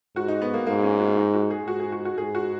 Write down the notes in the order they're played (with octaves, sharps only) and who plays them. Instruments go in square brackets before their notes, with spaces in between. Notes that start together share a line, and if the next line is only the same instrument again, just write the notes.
[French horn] G#2 [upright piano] F#4
[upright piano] D#4
B3
A#3
[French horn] G#2 [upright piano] A#3
[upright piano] C#4
F#4
D#4
F#4
G#4
[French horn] G#2 [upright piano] F#4
[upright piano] G#4
F#4
F#4
[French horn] G#2 [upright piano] G#4
[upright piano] F#4